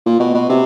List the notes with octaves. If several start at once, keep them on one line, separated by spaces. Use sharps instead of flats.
A#2
B2
B2
C3